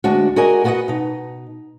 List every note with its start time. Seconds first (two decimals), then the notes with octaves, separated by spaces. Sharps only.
0.04 D2 G#3 D4 F#4
0.36 F#4 G#4 A#4 D5 D#5 G#5
0.64 B3 F#4 B4 D5 D#5 F#5
0.88 B2 D#4